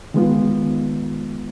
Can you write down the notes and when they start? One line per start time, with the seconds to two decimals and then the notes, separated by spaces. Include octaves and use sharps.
0.14 D#3 G#3 B3 F4